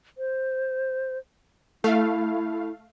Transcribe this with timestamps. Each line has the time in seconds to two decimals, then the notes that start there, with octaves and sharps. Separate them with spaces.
0.18 C5
1.84 A3 E4 F5